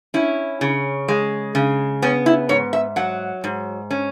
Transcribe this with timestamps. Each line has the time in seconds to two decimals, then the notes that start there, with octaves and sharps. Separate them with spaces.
0.14 C#4 E4
0.61 C#3
1.08 G#3
1.55 C#3
2.02 B3 C#4
2.26 E4
2.49 G#2 C#5
2.73 E5
2.96 F#3 F#5
3.44 G#2
3.91 C#4